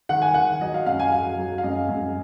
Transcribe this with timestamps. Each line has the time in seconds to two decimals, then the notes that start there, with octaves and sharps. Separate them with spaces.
0.09 D#3 F#5
0.22 G#5
0.34 D#3 F#5
0.61 F#3 D#5
0.74 F5
0.86 F#2 F5
1.00 G#5
1.12 F#3 F5
1.38 F#3
1.58 F5
1.63 F#2 D#5
1.89 F#2